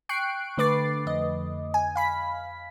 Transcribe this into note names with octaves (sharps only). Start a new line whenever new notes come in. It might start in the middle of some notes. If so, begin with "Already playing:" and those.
G5 C#6 F#6 C7 D7
D3 A3 B4 D6 A6 C7
F2 D#5
G#5
F5 B5 B6